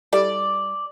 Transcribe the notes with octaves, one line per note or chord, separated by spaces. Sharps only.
G3 E4 A4 D5